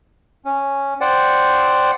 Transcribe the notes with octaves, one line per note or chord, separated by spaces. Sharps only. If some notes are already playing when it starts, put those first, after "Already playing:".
C#4
C5 D5 F#5 G5